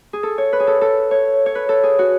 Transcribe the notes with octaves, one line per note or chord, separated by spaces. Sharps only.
G#4
A4
C#5
B4
G#4
A4
A4
C#5
C#5
B4
A4
G#4
F#4